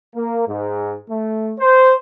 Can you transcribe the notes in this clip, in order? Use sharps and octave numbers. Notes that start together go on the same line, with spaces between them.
A#3
G#2
A3
C5